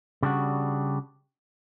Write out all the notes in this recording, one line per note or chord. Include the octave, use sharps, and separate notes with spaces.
C#3 G3 D4 F#4